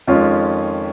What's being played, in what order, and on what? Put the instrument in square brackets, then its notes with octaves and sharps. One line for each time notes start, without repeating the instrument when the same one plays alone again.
[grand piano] F2 D#3 G#3 C#4 F4